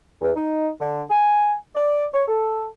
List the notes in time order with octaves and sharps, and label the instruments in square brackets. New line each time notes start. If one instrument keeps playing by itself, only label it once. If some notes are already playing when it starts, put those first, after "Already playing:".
[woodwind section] E2
D#4
D3
G#5
D5
C#5
A4